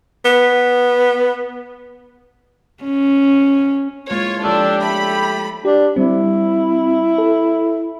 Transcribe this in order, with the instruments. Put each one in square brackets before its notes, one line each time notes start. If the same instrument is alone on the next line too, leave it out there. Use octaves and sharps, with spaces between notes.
[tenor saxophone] B3
[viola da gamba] C#4
[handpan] G#3 A#3 E4 [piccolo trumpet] F4 [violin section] C#5
[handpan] F3 F4 C#5 [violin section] D4 [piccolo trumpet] G4 [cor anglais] A4
[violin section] A3 B5 [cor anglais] E4
[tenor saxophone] D4 [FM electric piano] G4
[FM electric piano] G3 C4 [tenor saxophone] E4
[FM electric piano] A4